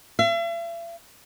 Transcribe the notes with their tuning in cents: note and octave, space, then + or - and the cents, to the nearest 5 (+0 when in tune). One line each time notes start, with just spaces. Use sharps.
E5 +45